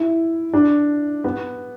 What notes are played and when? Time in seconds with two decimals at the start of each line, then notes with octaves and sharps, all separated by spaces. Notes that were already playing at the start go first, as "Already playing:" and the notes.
Already playing: E4
0.53 D4
1.24 B3